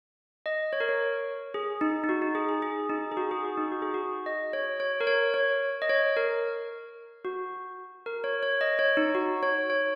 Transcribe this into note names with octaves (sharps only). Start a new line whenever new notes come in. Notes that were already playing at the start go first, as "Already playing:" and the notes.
D#5
C#5
A#4
C#5
G#4
D#4
D#4
F#4
D#4
G#4
G#4
G#4
D#4
G#4
F#4
G#4
F#4
D#4
F#4
G#4
F#4
D#5
C#5
C#5
A#4
C#5
C#5
D#5
C#5
A#4
F#4
A#4
C#5
C#5
D#5
C#5
D#4
F#4
C#5
C#5